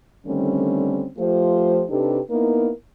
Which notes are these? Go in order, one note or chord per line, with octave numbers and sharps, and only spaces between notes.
D3 D#3 G3 A3 C4 C#4
F3 A3 F4 G4 C5
C3 D4 D#4 G4 A4 B4
A#3 B3 D#4 E4 A#4